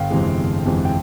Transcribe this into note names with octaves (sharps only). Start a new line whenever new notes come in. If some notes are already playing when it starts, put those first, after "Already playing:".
Already playing: G1 F5 G5
F2 C3 E3 G#3
G1
F2 C3 E3 G#3
G5